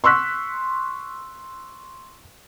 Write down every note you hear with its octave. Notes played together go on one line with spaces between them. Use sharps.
C6 C#6 E6 F#6 B6